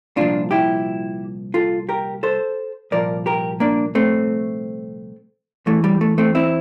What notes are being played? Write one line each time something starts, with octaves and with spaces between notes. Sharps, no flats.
C2 A#2 F3 D4 F4
E4 G4
F4 A4
G4 A#4
A4 C5
C2 A#2 F3 A#4 D5
G4 A#4
A#3 D4
A3 C4
E2 E3 A3
G3
A3
A3 C4
C4 E4